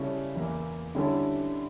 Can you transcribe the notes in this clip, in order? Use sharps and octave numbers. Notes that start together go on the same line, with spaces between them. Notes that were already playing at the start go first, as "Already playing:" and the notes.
Already playing: C#3 G3 C#4 E4 A4
E2 E3 A#3
D3 G3 C#4 E4 A4